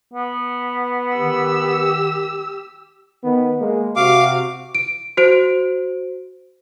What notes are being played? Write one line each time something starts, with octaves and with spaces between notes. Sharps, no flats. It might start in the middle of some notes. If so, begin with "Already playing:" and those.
B3
D#3 G4 E6
D#3 B3
G#3 A#3
C3 F#4 F5 D6
D7
F#4 C5 D7